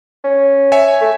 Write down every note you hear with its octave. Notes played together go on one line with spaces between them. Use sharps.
C#4
C#5 E5 G#5
A3